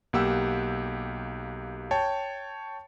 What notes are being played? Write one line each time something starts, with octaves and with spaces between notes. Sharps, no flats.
B1 A#3 G4 F#5 E6
C#5 G5 A5